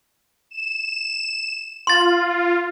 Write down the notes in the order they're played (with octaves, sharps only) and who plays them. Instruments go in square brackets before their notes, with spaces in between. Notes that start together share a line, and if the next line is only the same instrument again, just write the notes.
[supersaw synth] E7
[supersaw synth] F4 [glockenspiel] C6 A6